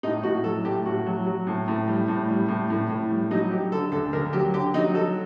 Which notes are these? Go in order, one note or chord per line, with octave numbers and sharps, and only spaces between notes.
A2 D#4
A2 F#4
F#3 A4
A2 G4
A2 F#4
F#3
F#3
A2
A2
G3
A2
G3
A2
A2
A2
G3
F#3 D#4
F#3 G4
D3 A4
D2 A4
D2 A#4
F#3 G4
D3 G4
F#3 D#4
F#3 A4